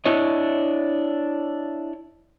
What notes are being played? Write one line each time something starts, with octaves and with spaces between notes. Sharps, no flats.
D4 E4 C#5 D#5